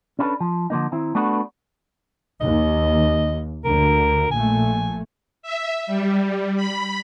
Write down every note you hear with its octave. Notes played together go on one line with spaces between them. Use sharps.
C#4 D4 E4 G#4 A4 B4
F3
D3 F3 A#3 D#4
D#3 C4 E4
A3 B3 D4 F#4 A4 B4
D#2 D#5
D2 D3 A#4
A#1 A#2 A3 G#5
E5
G3
B5